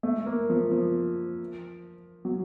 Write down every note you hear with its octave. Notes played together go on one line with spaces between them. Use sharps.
A3
A#3
F3
F3
F#3